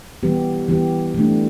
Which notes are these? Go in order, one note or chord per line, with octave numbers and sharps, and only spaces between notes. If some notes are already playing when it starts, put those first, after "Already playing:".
E3 G3 B3 G4
E3 G3 B3 G4
E3 A3 D4